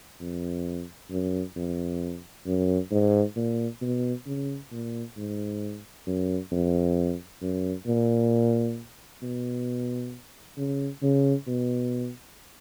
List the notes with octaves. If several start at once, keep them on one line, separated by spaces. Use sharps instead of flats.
F2
F#2
F2
F#2
G#2
A#2
B2
C#3
A#2
G#2
F#2
F2
F#2
A#2
B2
C#3
C#3
B2